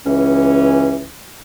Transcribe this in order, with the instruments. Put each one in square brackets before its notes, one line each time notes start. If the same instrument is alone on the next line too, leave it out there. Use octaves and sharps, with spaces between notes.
[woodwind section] C#2 E3 C#4